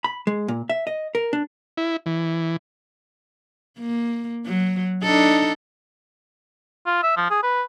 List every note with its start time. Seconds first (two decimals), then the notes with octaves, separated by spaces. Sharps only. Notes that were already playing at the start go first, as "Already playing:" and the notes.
0.04 B5
0.27 G#3
0.48 A#2
0.69 E5
0.87 D#5
1.15 A#4
1.33 D4
1.77 E4
2.06 E3
3.80 A#3
4.46 F#3
5.03 D4 D#4 A4
6.87 F4
7.03 E5
7.17 F3
7.31 G#4
7.43 B4